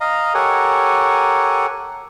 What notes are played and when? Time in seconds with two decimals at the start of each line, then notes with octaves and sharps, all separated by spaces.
0.01 D#5 F5 A#5
0.34 G4 A4 A#4 C#5 F#5 G#5